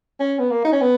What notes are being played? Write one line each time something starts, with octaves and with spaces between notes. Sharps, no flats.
C#4
B3
A#3
D#4
C#4
B3